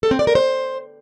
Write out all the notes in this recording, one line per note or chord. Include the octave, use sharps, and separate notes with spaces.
A4
C4
D5
A#4
C5